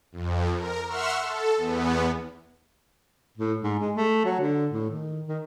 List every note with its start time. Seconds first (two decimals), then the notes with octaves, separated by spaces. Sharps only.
0.12 F2
0.56 A#4
0.86 E5 F#5 C6 C#6 E6 F6
1.22 A4
1.57 E2 B3
3.37 A2
3.62 G#2
3.80 G#3
3.95 A3
4.25 F#3
4.40 D3
4.71 A2
4.90 D#3
5.28 D#3